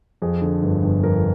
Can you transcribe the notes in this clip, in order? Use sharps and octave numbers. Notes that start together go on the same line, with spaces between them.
F2 G#4
D3
G1
G1
F2 A#4